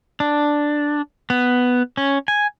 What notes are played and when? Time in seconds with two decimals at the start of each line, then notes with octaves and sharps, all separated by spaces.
0.20 D4
1.30 B3
1.97 C#4
2.28 G#5